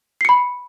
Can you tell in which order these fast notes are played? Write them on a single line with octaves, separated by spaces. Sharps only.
C7 C#7 B5